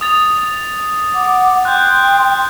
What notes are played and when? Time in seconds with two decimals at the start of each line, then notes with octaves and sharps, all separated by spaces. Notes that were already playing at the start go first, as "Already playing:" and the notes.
0.01 D#6 A6 F7
1.14 F#5 D6
1.65 G5 C6 F#6 G6